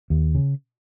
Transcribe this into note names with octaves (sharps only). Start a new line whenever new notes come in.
D#2
C#3